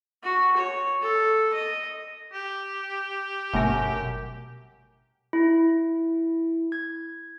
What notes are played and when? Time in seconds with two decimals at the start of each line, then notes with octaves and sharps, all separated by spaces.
0.24 F#4
0.57 C#5
1.02 A4
1.54 D#5
2.33 G4
3.54 G1 F#2 B2 A3 A#4
5.33 E4
6.72 G#6